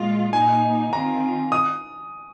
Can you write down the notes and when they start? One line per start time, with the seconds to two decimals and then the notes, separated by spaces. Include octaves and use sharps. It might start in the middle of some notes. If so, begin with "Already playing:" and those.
Already playing: A#2 G#3 F4
0.33 A#2 A#3 D#4 G#5
0.92 D#3 C4 F4 A#5
1.52 D#6